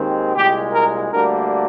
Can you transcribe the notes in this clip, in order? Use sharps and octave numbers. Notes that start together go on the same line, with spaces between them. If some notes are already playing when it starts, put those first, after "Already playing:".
Already playing: D#2 D#3 G#3 C4
C2 A#2 G#3 G4
A#4
D2 D3 G3 A#3 A#4